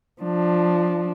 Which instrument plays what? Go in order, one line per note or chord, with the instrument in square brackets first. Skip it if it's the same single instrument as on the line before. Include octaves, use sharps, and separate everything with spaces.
[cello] F3 D4